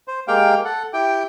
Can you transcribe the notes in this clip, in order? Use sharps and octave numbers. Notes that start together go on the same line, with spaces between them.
C5
G#3 A#3 G4 F5 G5
A4 F#5
E4 G4 G5